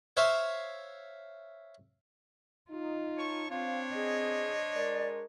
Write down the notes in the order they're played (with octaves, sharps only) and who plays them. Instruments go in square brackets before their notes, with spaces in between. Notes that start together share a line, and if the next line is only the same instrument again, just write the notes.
[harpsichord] C5 C#5 E5 F5
[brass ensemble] D#4 [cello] F4
[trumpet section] C#5 A5 C#6
[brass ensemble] C4 [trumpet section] D4 C5 C#5 [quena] F5
[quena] G#4 [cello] D#5
[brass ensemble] G#3 A#4 [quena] D5